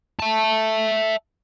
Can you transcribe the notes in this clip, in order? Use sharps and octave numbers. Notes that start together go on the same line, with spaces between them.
E5 A5